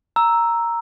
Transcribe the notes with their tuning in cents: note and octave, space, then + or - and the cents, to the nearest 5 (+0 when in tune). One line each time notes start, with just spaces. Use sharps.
A#5 +0 E6 +0